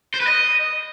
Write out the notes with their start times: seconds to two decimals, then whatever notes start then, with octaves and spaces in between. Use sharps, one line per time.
0.14 C5
0.20 B4
0.27 D#5